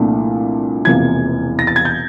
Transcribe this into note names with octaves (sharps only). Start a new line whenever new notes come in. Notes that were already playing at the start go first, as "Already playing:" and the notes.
Already playing: C2 A#2 F3 A3 D4
E1 E2 C3 F3 A#3 G#6
A#6
A6
G#6
G6